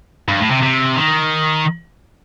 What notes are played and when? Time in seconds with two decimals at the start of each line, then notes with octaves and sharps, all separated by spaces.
0.29 G2
0.41 A2
0.51 C3
0.63 C3
0.96 D#3